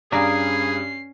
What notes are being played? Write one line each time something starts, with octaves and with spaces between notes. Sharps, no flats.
G2 C#4 G#4 D5 F5 G#5 A#5 C7